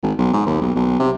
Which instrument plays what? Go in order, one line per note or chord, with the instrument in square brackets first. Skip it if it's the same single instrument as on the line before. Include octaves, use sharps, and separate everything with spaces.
[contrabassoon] G#1
B1
G#2
D#2
B1
B1
C3